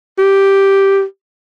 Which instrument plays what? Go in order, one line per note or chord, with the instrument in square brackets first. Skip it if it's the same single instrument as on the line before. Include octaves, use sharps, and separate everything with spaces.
[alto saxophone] G4